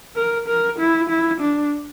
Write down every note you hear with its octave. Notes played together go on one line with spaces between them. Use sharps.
A#4
A#4
E4
E4
D4